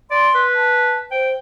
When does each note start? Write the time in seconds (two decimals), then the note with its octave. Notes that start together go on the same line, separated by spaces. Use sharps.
0.11 D5 C6
0.35 B4
0.55 A5
1.11 C5 G5